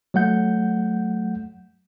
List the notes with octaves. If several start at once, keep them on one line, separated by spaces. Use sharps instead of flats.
F#3 A3 F#5 G6